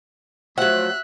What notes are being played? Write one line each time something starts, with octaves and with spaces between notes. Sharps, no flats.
F3 F#3 A3 E5 F#5 F#6